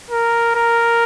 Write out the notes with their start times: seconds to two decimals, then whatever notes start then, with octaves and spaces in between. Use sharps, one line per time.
0.11 A#4
0.55 A#4